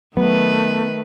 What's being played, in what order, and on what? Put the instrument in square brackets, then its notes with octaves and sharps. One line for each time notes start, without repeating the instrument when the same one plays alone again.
[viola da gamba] D#3 B4 [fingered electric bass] F#3 [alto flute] A3 [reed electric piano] B3